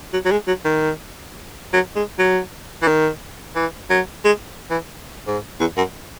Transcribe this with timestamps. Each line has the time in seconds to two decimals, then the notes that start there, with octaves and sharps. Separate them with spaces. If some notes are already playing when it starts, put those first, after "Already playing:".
0.13 F#3
0.25 F#3
0.32 G#3
0.48 F#3
0.65 D#3
1.73 F#3
1.96 G#3
2.19 F#3
2.82 E3
2.88 D#3
3.56 E3
3.90 F#3
4.25 G#3
4.70 E3
5.27 G#2
5.60 E2
5.77 F#2